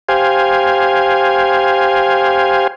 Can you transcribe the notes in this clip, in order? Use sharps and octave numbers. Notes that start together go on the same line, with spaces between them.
G4 C5 F5 G#5